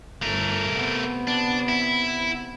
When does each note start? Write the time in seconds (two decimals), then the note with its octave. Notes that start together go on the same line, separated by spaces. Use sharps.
0.22 G1 A3 A#4
0.71 C3 B3
1.27 D4
1.69 E4